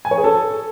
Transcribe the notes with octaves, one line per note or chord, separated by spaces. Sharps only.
G#5
C#5
G#4
A4